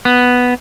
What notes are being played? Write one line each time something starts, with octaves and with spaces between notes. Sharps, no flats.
B3